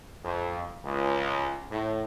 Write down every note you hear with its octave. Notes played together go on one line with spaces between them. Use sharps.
F2
C#2
A2